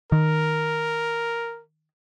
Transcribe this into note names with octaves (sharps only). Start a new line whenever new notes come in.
D#3 A#4